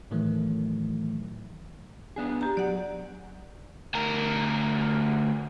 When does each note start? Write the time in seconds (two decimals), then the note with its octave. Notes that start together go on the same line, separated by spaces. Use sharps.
0.11 A2 D#3 E3 F#3 A3
2.16 B3 D4 G#4
2.41 G4 A#5
2.57 F#3 D5 F#5
3.94 D2 A#4